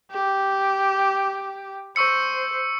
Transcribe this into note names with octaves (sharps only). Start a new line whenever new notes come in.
G4
C5 C#6 E6 C#7